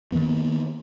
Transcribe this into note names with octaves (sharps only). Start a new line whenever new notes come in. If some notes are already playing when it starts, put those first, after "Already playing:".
D#3 F3 A#3 B3